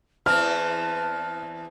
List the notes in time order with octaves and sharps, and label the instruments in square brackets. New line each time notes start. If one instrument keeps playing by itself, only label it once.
[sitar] E2 E3 C4 [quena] A5 [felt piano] F6